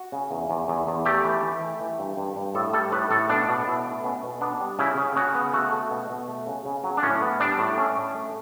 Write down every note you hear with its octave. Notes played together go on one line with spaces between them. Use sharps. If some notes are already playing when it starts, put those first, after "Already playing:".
Already playing: F#4
C#3
E2
E2
E2
E2
A3 G4
E3
E3
A3
E3
G2
G2
G2
A2 A4
G3 A4
A2 B4
A2 A4
B2 D4
B2
B2 E4
A3
B3 C#4
B2
B3 D4
G3
C#3 E4
C#3
C#3 F#4
B3
A3 F#4
A3
B2
B2
A3
C#3
C#3
F#3
D4
A2 C#4
B3
G3 D4
A2
A3 C#4
A3
A3